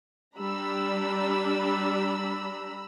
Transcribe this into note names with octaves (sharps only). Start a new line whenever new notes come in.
G3 D4 A#5 B5 E6